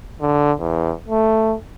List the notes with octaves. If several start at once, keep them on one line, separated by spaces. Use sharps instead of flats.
D3
E2
A3